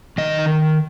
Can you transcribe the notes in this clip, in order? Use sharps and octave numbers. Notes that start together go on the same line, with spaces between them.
D#3 D#5